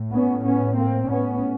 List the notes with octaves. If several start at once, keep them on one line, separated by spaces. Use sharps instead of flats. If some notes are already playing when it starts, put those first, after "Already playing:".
Already playing: A2
B3 C#4
B3 C#4
A#3 C4
A2 B3 C#4